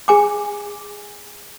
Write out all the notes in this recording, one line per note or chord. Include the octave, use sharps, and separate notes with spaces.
G#4 G#5 D6